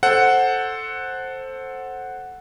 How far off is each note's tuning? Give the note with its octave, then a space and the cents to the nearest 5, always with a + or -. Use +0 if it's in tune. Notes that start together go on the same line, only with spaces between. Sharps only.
A4 +0 C5 +10 F#5 +0